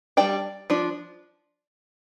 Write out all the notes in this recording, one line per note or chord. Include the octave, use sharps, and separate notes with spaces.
G3 D4 D5 G5
F3 D4